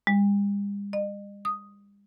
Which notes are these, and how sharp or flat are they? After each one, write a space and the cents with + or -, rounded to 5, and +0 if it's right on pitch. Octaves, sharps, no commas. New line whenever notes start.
G3 +45
D#5 -40
D#6 +0